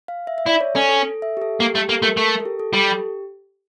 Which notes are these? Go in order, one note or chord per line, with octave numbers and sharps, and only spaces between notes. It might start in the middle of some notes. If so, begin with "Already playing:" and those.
F5
E5
E5
E4 D5
C#5
C#4 A4
A4
A4
E5
G4
A4
A#3 G4
A3 G4
A#3 A4
A3 A#4
A3 A#4
A4
G4
A4
G3 A4
G4